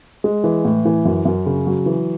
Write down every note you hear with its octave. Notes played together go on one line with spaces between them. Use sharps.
G#3
E3
A2
E3
F#2
F#2
C#3
F#3
E3